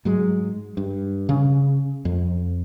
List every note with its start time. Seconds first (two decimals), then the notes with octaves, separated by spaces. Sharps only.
0.05 G#2 F#3 G#3
0.77 G2
1.29 C#3
2.05 F2